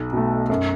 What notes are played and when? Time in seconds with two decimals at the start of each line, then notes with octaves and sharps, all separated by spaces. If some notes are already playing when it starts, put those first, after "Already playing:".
Already playing: B1
0.13 B2 A3
0.50 F#2